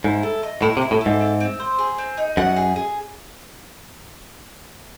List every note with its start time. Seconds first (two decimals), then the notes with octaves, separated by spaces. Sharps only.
0.04 G#2 E4
0.23 A4
0.43 D#5
0.62 A2 E4
0.77 C3
0.82 E4
0.91 A2
1.01 A4
1.06 G#2
1.20 C4
1.40 C4
1.60 C5
1.79 G#4
1.98 C4
2.18 D#4
2.37 F#2 F#5
2.56 G#4
2.76 G#4